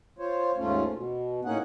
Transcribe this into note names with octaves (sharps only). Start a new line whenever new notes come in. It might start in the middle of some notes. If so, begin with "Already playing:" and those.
F4 C5 C#5
D#2 G#2 A3 C#4 F4
B2
A2 A#3 C#4 D#4 G#4 F#5